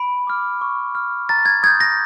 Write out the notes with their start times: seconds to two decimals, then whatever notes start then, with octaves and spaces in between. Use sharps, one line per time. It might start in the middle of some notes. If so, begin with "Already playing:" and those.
Already playing: B5 D7
0.27 D6 F6
0.61 C#6
0.95 F6
1.29 A#5 A6
1.46 G#6
1.63 D#6 G6 G#6
1.80 A#6